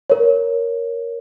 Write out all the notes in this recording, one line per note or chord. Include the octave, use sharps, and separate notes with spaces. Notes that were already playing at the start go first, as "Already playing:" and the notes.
A#4 C#5